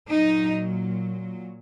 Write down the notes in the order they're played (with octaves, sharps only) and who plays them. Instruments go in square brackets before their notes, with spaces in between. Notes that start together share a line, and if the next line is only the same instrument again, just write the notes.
[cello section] A#2 F#3 D#4